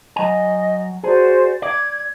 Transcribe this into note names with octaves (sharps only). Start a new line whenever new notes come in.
F#3 D#5 G#5
F#4 G#4 C5 D5
D5 G#6